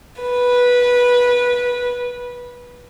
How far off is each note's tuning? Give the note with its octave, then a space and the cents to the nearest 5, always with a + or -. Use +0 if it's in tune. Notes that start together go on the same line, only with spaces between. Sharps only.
B4 -15